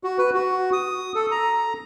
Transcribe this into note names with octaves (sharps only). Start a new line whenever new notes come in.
F#4
B4
F#4
D#6
A4
A#5